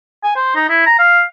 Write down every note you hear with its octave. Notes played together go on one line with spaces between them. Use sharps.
G#5
C5
D#4
E4
A#5
F5